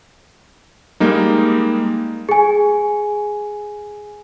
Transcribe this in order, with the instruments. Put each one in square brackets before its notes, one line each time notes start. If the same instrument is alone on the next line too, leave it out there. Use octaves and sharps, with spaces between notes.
[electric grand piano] G3 G#3 A#3 D#4
[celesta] G#4 G#5